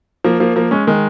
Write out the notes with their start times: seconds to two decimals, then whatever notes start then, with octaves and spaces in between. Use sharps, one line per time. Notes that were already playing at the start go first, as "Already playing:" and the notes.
0.24 F3 A#3
0.40 F3 A#3
0.56 F3 A#3
0.71 G#3 C#4
0.87 D#3 G#3